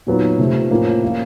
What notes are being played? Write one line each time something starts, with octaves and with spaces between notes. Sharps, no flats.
A#2 F#3 B3 D#4
C3 F3 A3
A2 F3 A#3 C#4
F3 A#3 C#4 F4